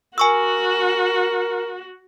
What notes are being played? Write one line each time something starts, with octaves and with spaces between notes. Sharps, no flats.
F#4 A#4 G#5 C#6 E6